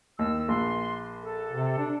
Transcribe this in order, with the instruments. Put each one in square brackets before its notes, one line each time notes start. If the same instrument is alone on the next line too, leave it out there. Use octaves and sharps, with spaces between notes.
[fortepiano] D#2 [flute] E6
[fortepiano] A#1 [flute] C6
[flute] A4
[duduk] C3
D4